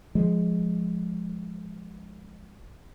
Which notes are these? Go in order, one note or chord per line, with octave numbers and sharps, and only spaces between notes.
F3 G#3